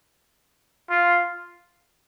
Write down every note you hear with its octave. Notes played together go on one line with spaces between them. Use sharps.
F4